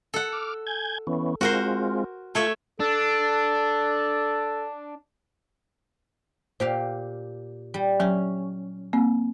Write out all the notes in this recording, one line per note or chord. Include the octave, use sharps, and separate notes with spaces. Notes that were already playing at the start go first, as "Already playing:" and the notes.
A4 F#5
D6 F6
G#5 G6 G#6
E3 B3 C#4
G#3 C4 F4 F#4 A#4 C5
A3 F4 C#5 E5 A5
D4 A4
A#2 G4 C5 F5
G3
F#3 C#4
A#3 C4